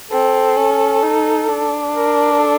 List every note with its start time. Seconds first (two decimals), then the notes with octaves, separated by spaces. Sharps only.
0.11 C4 A4
0.57 C#4
1.02 D#4
1.48 D4
1.95 A#4
2.32 A#4
2.40 A4